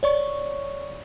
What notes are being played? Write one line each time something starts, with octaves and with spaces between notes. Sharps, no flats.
C#5 D5 C#6